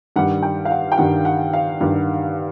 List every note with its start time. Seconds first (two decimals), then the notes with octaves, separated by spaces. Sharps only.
0.16 G2 D#3 G3 F#5
0.43 G5
0.65 F5
0.71 F#5
0.92 G5
0.98 G2 D#3 G3 F#5
1.25 F#5
1.53 F5
1.81 G2 D#3 G3